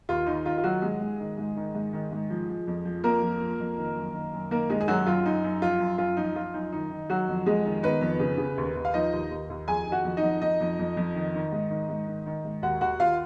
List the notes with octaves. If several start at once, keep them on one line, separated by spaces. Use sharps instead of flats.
D#2 F4
D#3 D#4
D#3 F4
F4
D#3 F#3 F#4
G#2 G#3 G#4
G#2
D#3
G#2
D#3
G#2
D#3
G#2
F3
F3
F2
F3
F2 A#3 A#4
F3
F3
F2
D#3
F#2
D#3
F#2
D#3 A#3 A#4
D#3 G#3 G#4
G#4
F#2 F#3 F#4
F#2 F4
F#2 D#4
F#2
F3 F4
F#2
F#2 F4
F3 D#4
F3 F4
F#2 D#4
D#3 D#4
D#3
D#3 F#3 F#4
F2
F2 G#3 G#4
D#3
D#3 B3 B4
F2
C#3
C#3
D#2
D#2
F5
F3 D#4 D#5
D#2
D#2
D#2
F2 G#4 G#5
D#3
F#4 F#5
F2
D#4 D#5
F2
F2 D#4 D#5
F2
F2
F2
D#3
D#3
G#2
D#3
G#2
D#3
D#3
G#2
D#2 F#4 F#5
D#2 F#4 F#5
D#2 F4 F5